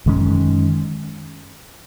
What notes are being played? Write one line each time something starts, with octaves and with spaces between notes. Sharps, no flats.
F#2 D#3 G#3 C#4